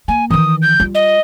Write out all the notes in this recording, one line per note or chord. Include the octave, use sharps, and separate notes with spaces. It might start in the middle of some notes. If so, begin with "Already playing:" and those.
A#3 G#5
D#3 E3 D#6
G6
G3 F4
D#5